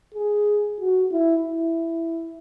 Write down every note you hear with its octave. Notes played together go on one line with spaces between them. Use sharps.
G#4
F#4
E4
E4